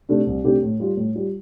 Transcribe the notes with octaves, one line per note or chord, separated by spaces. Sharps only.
C3 A3 D4 G4
C2
C3 A3 D4 G4
A2
G3 F4
A2
G3 F4